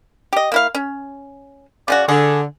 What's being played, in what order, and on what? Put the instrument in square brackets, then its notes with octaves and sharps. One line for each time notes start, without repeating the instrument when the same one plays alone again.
[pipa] G4 D#5
A#3 E4 F5
C#4
[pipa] C#3 C#4 F#4 [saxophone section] D5
[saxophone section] D3 [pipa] G#4